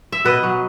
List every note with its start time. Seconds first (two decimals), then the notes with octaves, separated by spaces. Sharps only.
0.12 E5
0.25 B2 B4 D#5
0.43 F#3